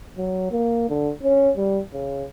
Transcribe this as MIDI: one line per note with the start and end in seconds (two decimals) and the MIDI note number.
0.17 0.47 54
0.51 0.88 58
0.89 1.11 50
1.23 1.50 61
1.57 1.79 55
1.93 2.24 49